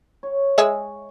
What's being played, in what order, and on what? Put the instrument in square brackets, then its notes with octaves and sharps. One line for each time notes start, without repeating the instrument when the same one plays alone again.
[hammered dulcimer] C#5
[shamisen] G#3 G#4 E5